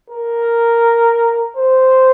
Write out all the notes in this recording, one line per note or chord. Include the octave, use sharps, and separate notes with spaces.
A#4
C5